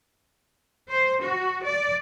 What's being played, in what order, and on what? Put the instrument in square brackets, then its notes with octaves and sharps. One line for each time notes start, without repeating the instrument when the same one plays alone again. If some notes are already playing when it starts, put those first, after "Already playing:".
[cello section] C5
F#4
D5